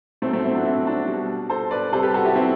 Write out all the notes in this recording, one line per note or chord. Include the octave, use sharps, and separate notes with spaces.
B2 F#3 A3 C4
A3 C4
C4 E4
D4 F#4
C4 E4
D4 F#4
B2 G3
A4 C5
B4 D5
C3 G3 A4 C5
G4 B4
F#4 A4
E4 G4
C4 E4